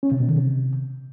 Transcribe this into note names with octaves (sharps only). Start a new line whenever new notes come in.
C#4
C3
B2
D#3
C3